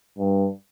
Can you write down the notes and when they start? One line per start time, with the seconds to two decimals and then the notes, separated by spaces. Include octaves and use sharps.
0.19 G2